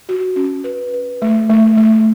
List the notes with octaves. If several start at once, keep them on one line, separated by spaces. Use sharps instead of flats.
F#4
C#4
B4
B4
A3
A3
A3